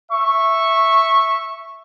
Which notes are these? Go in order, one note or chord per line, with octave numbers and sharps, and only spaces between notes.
E5 C#6